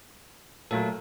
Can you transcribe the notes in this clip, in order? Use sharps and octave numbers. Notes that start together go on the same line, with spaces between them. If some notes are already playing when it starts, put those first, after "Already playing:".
A#2 F#3 A3 A4